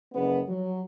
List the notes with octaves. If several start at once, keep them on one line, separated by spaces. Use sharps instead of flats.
F#1 B3
F#3